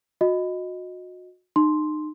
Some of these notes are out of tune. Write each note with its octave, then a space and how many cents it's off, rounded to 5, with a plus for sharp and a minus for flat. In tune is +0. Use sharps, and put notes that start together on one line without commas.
F#4 -30 D#5 +0
D#4 -35 C6 +0